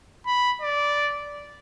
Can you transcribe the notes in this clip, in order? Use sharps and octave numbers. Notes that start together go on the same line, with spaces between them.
B5
D5